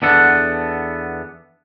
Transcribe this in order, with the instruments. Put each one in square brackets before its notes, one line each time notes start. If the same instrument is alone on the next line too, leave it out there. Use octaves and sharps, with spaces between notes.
[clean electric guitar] E2 B3 D4 A4 F#5